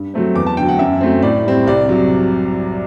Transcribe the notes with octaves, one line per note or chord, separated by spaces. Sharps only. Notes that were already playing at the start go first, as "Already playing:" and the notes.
Already playing: G2
F#3 A3 C4
E2 D6
A5
D3 F#3 G5
F#5
F#2 E5
F#3 A3 C4
A2 D5
G3 C4
C2 D5
C3 F#3